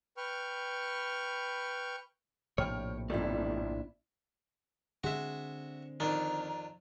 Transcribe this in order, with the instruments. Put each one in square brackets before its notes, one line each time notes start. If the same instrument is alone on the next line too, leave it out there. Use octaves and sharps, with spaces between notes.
[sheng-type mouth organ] B4 G5 C#6 F6
[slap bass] A#1 A2 C3 [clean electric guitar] C#5 [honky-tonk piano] G5 F6
[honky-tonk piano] G1 F2 [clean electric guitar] E3 G3 A3 [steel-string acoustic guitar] D4 E4
[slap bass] D3 C4 [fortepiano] G#3 [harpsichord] F#4 E5
[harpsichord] F2 D4 [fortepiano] D#3 [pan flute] A#5